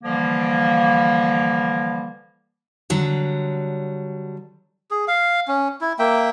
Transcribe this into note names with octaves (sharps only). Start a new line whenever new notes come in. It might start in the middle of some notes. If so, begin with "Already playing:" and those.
D3 E3 F3 G3 A#3
D3 F#3 G3
G#4
F5
C#4
E4
A#3 E5 G5